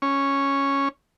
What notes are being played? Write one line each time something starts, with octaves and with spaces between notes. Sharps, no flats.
C#4